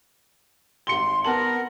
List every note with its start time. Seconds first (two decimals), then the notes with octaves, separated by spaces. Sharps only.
0.87 G#1 C6 C#7 G7
1.24 B3 A#4 A5 F#7